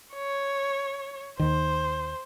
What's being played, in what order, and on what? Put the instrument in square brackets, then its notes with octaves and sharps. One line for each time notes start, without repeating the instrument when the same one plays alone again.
[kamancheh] C#5
[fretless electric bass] D#2 D#3 [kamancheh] C5